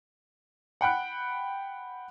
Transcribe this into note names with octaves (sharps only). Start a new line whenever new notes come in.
F#5 G5 B5 F#6